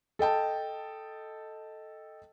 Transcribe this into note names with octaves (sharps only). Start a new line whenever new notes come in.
A4 D#5 G5 A5